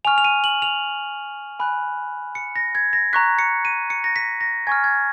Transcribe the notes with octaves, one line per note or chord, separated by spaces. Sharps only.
G#5 C#6 F6 F7
F7
D#7
F#7
F7
G#5 B5 F#6
C#7
A#6
G#6
A#6
A#5 C#6 F#6 B6
C#7
D#7
C#7
A#6
B6
A#6
G#5 C#6 F6 G#6
G#6